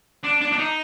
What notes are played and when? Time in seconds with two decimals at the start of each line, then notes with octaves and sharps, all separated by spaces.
0.23 D4
0.41 D4
0.52 D4
0.58 D#4